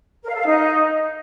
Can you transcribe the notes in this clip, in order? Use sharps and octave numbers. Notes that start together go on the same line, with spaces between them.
A#4
F5
A4
F5
D#4